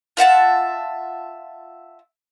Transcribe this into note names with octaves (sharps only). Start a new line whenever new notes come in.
F4 E5 F#5 A5